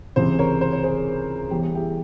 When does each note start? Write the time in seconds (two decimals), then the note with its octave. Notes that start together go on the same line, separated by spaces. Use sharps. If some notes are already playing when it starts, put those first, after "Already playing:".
0.16 C#2 C3 E3 G#4 C5
0.39 A#4 C#5
0.61 C5
0.72 C#5
0.83 G#4 C5
1.51 E2 E3 G3 G4
1.63 G#4
1.75 E4 G4